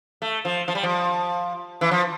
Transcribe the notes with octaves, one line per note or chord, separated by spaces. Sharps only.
A3
F3
F3
G3
F3
E3
F3